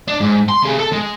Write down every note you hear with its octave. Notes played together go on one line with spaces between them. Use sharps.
D4
G#2
C6
C3 G#4
A4
G#3